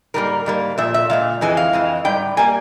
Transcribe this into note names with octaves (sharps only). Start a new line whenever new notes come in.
G#2 G3 A#3 A#4
G#2 G3 A#3
A#2 F3 E5
E5
A#2 F3 G#3 F5
F2 E3 G#3 G#5
F5
F2 E3 G#3
G#2 G3 G5
G3 A#3 G#5